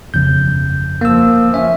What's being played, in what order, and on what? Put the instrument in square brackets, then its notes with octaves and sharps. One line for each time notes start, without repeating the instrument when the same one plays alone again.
[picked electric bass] G1 F2 C#3 [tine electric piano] G6
[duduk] F3 [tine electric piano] A#3 E6
[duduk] C#4 [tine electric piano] E5